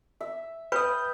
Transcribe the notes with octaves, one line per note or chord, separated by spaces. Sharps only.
E5
B4 G5 B5 D#6